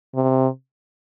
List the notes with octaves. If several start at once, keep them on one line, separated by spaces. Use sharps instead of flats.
C3